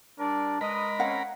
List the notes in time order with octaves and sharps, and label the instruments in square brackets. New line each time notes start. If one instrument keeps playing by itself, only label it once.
[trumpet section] G3 A#4 D5 [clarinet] D4
[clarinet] G#3 [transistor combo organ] A#4 B5 [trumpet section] B4 D#5
[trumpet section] C4 C#4 [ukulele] F5 F#5